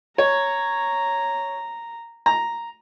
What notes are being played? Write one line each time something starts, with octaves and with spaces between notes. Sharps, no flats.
C#5 A#5
A#5